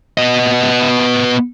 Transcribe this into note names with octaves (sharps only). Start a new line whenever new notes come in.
B3 D#5